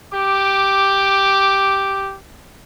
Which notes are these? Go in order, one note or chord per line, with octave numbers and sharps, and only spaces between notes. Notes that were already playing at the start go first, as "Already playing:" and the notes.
G4 D6